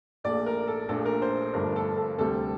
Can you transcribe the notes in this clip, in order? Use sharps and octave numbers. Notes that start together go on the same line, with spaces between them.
A#1 A#2 A3 D5
A#4
A4
A#1 A#2 A3 D4 A4
A#4
C5
G1 G2 F3 A3 D4 A#4
A4
A4
D2 C3 G3 A4